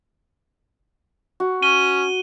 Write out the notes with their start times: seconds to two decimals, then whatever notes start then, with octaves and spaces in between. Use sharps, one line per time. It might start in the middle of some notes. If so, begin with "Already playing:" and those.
1.40 F#4
1.62 C#4 D#7 G7